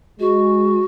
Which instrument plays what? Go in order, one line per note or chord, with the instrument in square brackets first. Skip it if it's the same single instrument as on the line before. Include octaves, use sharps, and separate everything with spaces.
[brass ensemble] G#3 [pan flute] F#4